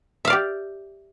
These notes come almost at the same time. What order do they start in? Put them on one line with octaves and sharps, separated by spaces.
E5 F5 D5 G4